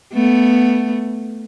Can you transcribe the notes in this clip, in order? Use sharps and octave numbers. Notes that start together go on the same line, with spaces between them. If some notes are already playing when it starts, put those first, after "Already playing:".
A3 B3